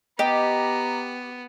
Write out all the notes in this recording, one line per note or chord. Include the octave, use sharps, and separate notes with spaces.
B3 G4 D#5 A#5